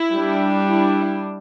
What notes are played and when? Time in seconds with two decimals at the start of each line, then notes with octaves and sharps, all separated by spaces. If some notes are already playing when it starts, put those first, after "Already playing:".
Already playing: E4
0.14 G3 D4
0.66 E4